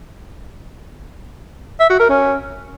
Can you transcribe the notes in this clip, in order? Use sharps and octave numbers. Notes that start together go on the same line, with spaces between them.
E5
F#4
A#4
C#4